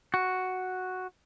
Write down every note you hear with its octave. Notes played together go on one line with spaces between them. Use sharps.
F#4